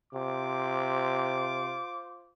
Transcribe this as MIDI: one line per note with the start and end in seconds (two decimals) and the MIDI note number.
0.14 1.80 48
0.14 2.33 65
0.14 2.33 72
0.14 2.33 86